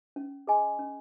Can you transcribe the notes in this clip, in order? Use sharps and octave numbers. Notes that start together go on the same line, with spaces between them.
C#4
G#4 D#5 G#5 C6
C#4